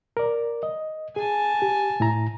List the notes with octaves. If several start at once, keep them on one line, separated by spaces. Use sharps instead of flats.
A#4 D5
D#5
G#4 G#5 A5
G4
A2 E4 A#5